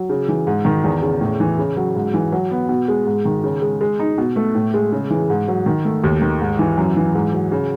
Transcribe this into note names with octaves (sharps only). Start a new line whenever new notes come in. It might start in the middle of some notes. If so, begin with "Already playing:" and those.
Already playing: F#3
C#3
E3
G#2
D#3
E2
C#3
A2
E3
C#3
F#3
G#2
E3
F#3
B3
B2
G#3
G#2
D#3
C#3
G#3
G#3
D#4
B2
A3
A2
G#3
C#3
E3
G#2
F#3
D#3
A3
D#2
D#3
G#2
E3
F#2
E3
G#2
F#3
C#3